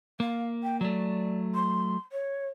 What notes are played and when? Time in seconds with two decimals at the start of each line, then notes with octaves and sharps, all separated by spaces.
0.20 A#3 F5
0.63 G5
0.81 F#3 A3 D5
1.54 C6
2.12 C#5